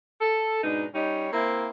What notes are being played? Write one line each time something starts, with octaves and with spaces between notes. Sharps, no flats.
A4
G#2 B2 D4 D#4
G3 C#4 D#4
A#3 C4 E4